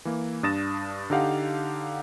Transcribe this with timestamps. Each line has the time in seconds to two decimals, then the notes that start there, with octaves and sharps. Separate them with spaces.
0.05 E3 A#3
0.43 G2 D4 D#6 A6 A#6 E7
1.10 D3 D#4 G4 F5 F#5